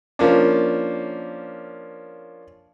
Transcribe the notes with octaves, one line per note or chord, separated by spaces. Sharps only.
F3 A#3 C#4 D4